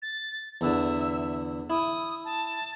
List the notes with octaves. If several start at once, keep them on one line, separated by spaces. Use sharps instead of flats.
A6
E2 D3 E5
E4 D#6
A5